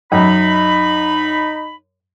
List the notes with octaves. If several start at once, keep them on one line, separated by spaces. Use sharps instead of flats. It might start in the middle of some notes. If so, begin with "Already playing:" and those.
F#2 D#4 B5